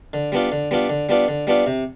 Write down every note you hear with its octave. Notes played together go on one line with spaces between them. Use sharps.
D3
G3 B3 D4 F4
D3
G3 B3 D4 F4
D3
G3 B3 D4 F4
D3
G3 B3 D4 F4
C3